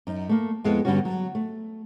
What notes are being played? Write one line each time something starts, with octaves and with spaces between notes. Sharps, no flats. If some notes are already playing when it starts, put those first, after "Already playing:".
F#2 D#4
A3 A#3
F2 G#3 B3 E4 A4
G2 D3 G3 B3 C#4 F#4
F#3
A3